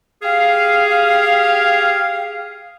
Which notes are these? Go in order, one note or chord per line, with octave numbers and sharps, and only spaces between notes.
G4 G#4 F5